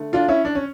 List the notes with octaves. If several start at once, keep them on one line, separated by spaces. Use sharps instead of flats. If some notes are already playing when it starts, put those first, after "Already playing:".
Already playing: D3 A3
D4 F4
C#4 E4
D4
C#4